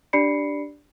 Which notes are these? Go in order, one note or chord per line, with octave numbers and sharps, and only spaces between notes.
D4 G4 D5 B5 C7 C#7